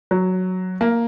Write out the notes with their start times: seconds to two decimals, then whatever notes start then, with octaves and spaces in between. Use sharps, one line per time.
0.11 F#3
0.81 A#3